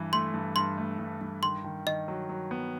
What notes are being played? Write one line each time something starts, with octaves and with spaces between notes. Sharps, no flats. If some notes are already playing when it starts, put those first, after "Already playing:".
Already playing: G2 E3
A3 C6
G2
G2 C6
A3
G2
G2
D#3 C6
D#3
D#3 D#5
F#3
F#3
B3